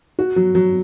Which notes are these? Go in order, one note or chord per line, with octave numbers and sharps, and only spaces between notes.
F#4
F#3
F#3